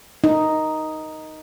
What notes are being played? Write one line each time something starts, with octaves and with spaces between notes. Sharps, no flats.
D#4